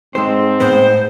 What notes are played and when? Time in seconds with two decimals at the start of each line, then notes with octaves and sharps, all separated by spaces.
0.15 G#2 G#3 C4 A4 C5
0.60 A2 G#3 B3 C5